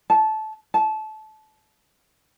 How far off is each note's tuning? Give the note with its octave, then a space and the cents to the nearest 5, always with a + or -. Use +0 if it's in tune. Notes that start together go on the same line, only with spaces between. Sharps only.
A5 -20
A5 -25